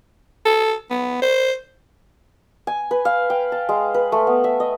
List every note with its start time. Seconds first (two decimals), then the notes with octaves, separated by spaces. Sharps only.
0.46 A4
0.90 B3
1.22 C5
2.67 G#5
2.91 B4
3.05 F5
3.30 G5
3.52 A5
3.69 G#3
3.94 B4
4.12 A3
4.27 B3
4.44 E5
4.60 D#5